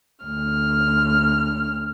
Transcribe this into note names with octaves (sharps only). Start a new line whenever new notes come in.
D2 F6